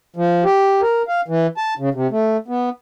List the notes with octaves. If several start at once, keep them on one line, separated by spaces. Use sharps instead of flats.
F3
G4
A#4
F5
E3
A5
C#3
C3
A3
B3